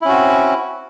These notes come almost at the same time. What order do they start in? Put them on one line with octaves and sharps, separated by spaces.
E4 C#4 F#4 C4